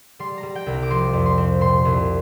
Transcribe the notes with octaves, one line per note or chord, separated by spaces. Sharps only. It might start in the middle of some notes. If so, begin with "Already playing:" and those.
G3 C6
A#5
G3
G5
C2
A#5
D6
F3 C6
F2
C6
C4
A#2 C6
C2